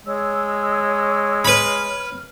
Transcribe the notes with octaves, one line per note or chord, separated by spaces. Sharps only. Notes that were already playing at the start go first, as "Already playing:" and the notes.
G#3 C#5 E6
B4 B5 F6